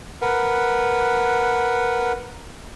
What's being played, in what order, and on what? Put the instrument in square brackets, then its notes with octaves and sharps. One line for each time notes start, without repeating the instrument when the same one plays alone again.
[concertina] A#4 B4 F#5